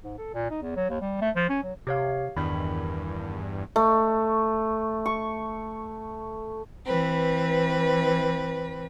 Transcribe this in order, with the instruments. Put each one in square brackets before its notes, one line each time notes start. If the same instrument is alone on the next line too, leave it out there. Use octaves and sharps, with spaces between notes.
[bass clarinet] G#2
A4
A#2
D#4
E2
F#3
D#2
G3
A3
F3
C#4
F#3
[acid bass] C3 [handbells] G4 C#5 F5
[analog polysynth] E2 G2 [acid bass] D#3 [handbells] B5
[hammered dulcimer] A3
C#6
[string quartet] E3 C4 B4